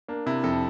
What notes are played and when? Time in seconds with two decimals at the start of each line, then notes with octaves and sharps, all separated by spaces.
0.08 A#3 D4
0.26 C3 E4
0.44 F2 A4